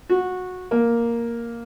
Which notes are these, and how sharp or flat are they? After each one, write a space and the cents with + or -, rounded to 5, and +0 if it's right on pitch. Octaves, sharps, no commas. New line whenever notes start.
F#4 -15
A#3 +0